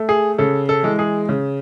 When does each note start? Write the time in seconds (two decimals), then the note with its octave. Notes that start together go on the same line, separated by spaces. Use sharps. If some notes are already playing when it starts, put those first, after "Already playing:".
Already playing: A3
0.09 G#4
0.38 C#3 A4
0.69 A4
0.83 E3 G#3
0.99 G#4
1.29 C#3